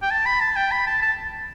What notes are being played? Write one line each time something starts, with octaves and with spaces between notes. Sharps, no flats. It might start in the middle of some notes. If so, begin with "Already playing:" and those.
G5
A5
B5
A5
G5
B5
A5
A5